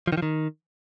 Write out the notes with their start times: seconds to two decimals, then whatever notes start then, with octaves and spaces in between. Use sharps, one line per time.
0.07 F3
0.12 D#3
0.17 F3
0.22 D#3